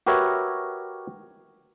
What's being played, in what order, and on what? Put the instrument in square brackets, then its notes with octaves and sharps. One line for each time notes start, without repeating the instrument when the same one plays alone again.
[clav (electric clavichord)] F#4 G4 A#4 B4 C#5 E5